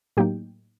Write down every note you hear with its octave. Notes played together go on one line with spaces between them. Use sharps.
A2 F#3 A#3 D#4 G4 G5